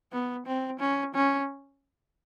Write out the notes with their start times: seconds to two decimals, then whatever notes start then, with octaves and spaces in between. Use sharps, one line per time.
0.12 B3
0.46 C4
0.80 C#4
1.14 C#4